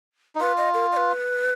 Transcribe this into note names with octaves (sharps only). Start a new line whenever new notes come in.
D#4
F4 B4
D#5
A#4
D#5
B4